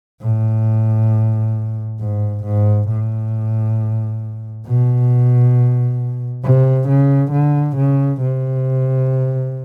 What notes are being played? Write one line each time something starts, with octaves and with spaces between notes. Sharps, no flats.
A2
G#2
G#2
A2
B2
C3
C#3
D3
C#3
C3